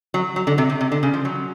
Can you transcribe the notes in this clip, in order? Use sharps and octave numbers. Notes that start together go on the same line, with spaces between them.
F#3
F#3
D3
C3
C3
C3
D3
C#3
F3
F#3